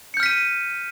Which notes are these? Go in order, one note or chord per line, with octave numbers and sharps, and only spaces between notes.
F6 G6 B6 C#7 D#7